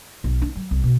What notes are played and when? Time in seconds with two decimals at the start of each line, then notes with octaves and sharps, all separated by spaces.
0.24 B1
0.42 D4
0.55 F#3
0.71 C2
0.84 B2